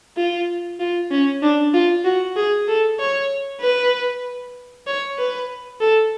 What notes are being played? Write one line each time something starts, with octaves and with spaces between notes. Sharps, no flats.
F4
F4
C#4
D4
F4
F#4
G#4
A4
C#5
B4
C#5
B4
A4